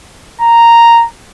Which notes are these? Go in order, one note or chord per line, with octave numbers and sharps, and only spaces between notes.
A#5